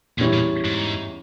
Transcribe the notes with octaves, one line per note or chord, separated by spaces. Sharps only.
E2 A#2 E3 G3 C#4 E4
A#2
G#2